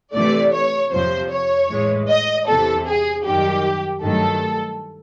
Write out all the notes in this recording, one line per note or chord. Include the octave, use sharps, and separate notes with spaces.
C3 E3 A3 D5
C#5
F2 C3 F3 C5
C#5
A2 E3 G#3
D#5
E2 C3 E3 A4
G#4
F#2 D#3 G3 G4
G2 D#3 F#3 A3 A4